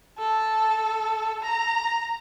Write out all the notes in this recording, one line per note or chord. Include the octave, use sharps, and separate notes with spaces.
A4
A#5